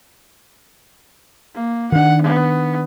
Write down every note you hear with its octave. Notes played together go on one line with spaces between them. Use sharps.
A#3
D#3 D4 F#5
B3